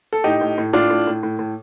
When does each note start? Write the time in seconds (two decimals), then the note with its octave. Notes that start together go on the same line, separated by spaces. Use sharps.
0.13 A4
0.24 A2 D#4 G4
0.41 A2
0.58 A2
0.73 A2 D4 F4
0.90 A2
1.07 A2
1.23 A2
1.39 A2